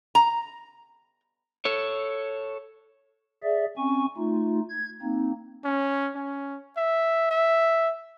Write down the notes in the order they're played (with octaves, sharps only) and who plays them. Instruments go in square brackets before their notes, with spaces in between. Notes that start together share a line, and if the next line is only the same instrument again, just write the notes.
[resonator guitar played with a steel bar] A#5
[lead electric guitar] A4 C#5
[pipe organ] G#4 D5 E5
C4 C#4 G#5 C#6
A3 D#4 F4
G#6
A#3 C4 D#4
[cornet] C#4
C#4
E5
E5